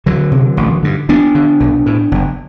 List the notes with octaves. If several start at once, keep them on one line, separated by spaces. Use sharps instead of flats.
D2 D3 F#3
C3
A1
G2 D3
D2 B3 D4
D3
B1
A2
F#1